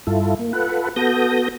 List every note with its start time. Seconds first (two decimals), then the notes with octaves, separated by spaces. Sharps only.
0.07 G2 E4 F4 A4
0.39 A#3
0.53 F4 A4 B4 F#5
0.96 B3 F#4 A4 D#6 G6 A#6